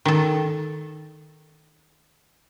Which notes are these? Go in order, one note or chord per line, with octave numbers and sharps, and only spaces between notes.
D#3 A4